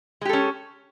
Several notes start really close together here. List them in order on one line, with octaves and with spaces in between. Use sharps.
G#3 G4 A4 C#4